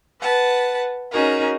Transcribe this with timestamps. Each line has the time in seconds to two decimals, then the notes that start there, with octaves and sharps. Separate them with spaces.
0.19 B4 F#5 A5
1.11 C#4 D#4 F#4 G#4 A#4